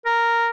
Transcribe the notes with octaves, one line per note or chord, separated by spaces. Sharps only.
A#4